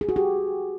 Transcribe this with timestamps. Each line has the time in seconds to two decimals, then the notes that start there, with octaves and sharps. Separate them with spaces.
0.01 G#4
0.09 F#4
0.16 G4